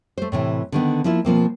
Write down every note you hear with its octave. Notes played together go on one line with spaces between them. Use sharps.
A3 C5
A2 C3 E3
D3 D#3 B3
F3 A#3 E4 F4
B2 F3 A#3 C4